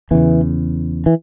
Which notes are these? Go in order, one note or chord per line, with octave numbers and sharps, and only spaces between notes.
E2 C#3 E3
E3